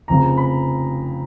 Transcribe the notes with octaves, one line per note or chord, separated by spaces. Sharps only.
F1 F2 C#3 F3 A#5
B5